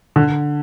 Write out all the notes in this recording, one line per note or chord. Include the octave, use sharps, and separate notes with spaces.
D3